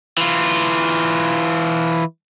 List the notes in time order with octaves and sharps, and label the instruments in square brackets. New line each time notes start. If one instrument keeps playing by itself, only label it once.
[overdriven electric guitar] E3 F4